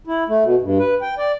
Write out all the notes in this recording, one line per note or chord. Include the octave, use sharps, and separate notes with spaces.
E4
A3
B2
G2
B4
G5
D5